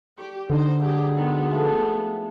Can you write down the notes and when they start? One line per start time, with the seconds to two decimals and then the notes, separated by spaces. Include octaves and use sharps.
0.18 G4 D5 C#6
0.50 D3 B3 D#4 C5
0.80 G2 B2 F#3 G4 G#4
1.15 D#3 F#3 G#3 B3
1.50 F3 A3 G#4